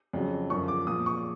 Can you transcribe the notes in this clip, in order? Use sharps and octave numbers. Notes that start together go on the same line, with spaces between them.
F2 C#3 F#3
F#2 D3 F3 C#6
D6
A#2 F3 D#6
C#6